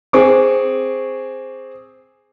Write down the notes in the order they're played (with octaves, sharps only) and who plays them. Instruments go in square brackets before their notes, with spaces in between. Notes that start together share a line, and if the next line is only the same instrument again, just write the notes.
[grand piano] C4 G#4 C#6 D6